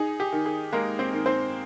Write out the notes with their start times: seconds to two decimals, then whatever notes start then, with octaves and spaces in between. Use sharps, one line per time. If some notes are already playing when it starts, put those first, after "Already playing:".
Already playing: D#4 G#4
0.20 G4
0.32 D#3
0.46 G#4
0.73 G#3 A#3 A#4
0.99 C4 C5
1.13 D#3
1.26 C4 C5